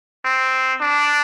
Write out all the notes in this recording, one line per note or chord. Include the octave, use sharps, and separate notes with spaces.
C4
D4